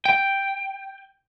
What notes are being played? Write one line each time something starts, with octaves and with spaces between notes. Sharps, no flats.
G5